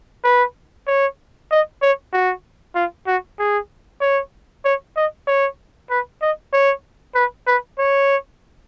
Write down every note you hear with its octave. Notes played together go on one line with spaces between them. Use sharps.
B4
C#5
D#5
C#5
F#4
F4
F#4
G#4
C#5
C#5
D#5
C#5
B4
D#5
C#5
B4
B4
C#5